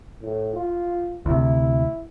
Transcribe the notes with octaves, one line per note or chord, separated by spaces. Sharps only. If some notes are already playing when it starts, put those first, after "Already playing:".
A2
F4
D2 C3 E4